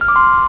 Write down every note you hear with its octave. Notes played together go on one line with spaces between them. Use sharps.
F6
D6
C6